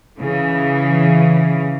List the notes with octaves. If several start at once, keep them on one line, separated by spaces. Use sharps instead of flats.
C#3 E3